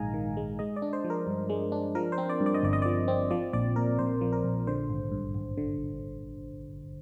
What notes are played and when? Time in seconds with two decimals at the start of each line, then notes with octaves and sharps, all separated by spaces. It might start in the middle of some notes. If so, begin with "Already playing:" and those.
Already playing: A#1 G#2 D#3 G#3 D#5 F5 G#5 A#5
0.14 D#3
0.37 G#3
0.59 G#3 D#5
0.76 D5
0.82 D4
0.93 C5
1.04 F3
1.10 A#4
1.27 G2
1.50 G#3
1.72 D4
1.95 F3 A#4
2.12 C5
2.18 C4
2.30 D5
2.40 G2
2.46 D5
2.54 D#5
2.63 G1 D5
2.73 D#5
2.82 F3 D5
3.08 C4
3.31 F3 D5
3.53 A#1 D5
3.76 A#2 A#4
3.99 A#1 C5
4.21 F3
4.33 A#4
4.44 A#1
4.67 D3 C5
4.89 G#1
5.12 G2
5.34 G#1
5.58 D3